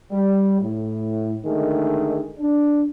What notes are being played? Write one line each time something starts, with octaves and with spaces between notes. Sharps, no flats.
G3
A2
D3 D#3 G#3 A3 G#4
D4